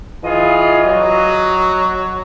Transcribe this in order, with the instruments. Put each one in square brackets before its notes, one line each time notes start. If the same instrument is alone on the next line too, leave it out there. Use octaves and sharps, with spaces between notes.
[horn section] E3 F4 G#4 [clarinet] D#5
[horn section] F#3